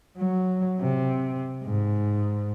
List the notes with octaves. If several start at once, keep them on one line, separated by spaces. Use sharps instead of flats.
F#3
C3
G#2